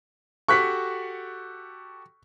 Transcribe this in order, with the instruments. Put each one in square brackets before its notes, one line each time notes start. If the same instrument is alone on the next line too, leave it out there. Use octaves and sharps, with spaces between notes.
[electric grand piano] F#4 G4 A4 [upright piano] C#6 F#6 B6